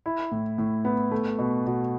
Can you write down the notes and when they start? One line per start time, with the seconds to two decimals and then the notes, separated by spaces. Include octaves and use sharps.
0.06 E4
0.32 A2
0.58 A2
0.85 B3
1.11 A3
1.39 B2
1.66 B2